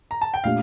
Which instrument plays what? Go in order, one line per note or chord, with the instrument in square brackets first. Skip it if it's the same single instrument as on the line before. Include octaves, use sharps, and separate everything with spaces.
[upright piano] A#5
A5
G5
[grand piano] A#2 A3 D4 G4 [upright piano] F5